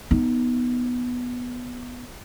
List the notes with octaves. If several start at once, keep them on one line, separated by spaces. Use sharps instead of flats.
B3 D#4